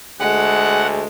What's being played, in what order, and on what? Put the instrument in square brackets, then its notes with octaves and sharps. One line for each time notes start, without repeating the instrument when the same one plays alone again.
[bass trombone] D2 [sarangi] G#3 [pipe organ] F#5